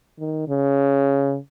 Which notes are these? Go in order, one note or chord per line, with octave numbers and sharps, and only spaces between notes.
D#3
C#3